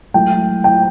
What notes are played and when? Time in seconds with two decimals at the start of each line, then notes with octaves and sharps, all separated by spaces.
0.14 F#3 A3 E4 G5
0.64 G5